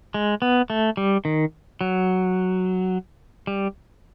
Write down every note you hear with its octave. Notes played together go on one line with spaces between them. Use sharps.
G#3
B3
A3
G3
D#3
F#3
G3